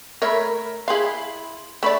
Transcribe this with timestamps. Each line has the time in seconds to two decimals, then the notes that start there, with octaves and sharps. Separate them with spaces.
0.22 A3 A#4 C#5 E5 B5
0.88 E4 G#4 F5 B5 C6
1.83 A3 D4 D5 E5 B5